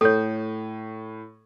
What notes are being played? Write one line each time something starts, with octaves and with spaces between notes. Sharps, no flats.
A2 A4 C#5